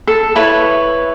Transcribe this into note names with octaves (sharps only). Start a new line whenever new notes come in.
A4
E4 B4 C#5